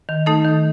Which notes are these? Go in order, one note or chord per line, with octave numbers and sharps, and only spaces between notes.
D#3
A3 D#4 A4
D#3